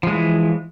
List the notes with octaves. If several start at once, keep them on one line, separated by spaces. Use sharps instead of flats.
E3 F3 G#3